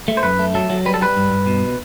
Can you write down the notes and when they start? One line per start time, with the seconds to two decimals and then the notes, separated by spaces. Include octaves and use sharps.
0.08 A3
0.17 C5
0.23 F#2 B4
0.39 A3
0.54 F#3 A4
0.70 F#3
0.85 G3 B4
0.94 A4
1.01 G3 B4
1.17 G2
1.32 G2
1.47 B2